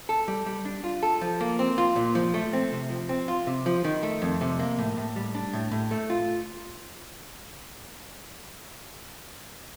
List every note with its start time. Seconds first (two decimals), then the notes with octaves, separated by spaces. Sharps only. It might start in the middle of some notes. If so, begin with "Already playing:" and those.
0.09 A4
0.28 G3
0.46 G3
0.65 D4
0.84 F4
1.03 A4
1.21 F3
1.41 A#3
1.59 C4
1.78 F4
1.96 A#2
2.15 F3
2.34 A3
2.53 C4
2.72 C3
2.90 F3
3.09 C4
3.28 F4
3.47 C3
3.66 F3
3.84 D#3
4.03 A3
4.22 F2
4.41 C3
4.59 A#3
4.78 A2
4.97 A2
5.16 G3
5.35 D4
5.53 A2
5.72 A2
5.91 A3
6.10 F4